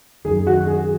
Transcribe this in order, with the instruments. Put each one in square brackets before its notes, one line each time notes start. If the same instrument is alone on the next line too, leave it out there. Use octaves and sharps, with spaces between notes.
[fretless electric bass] F#2 D#3 F#3 [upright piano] G#4
[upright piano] F#4
G#4